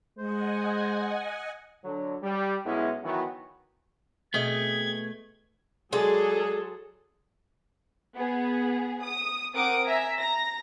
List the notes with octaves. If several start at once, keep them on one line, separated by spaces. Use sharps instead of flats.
G#3 C5 D#5 F#5 G#5
D3 F#3
G3
B1 G#3 B3 C#4 E4
D#3 E3 F#3 B3 E4 F#4
B2 A3 C4 G#4 D#5 E5 G#6
F#3 G#3 G#4 A4 D5
B3 G#4
D#6
C4 A#4 F#5 D6 D#6 D7
E5 G#5 A#5
A#5 A#6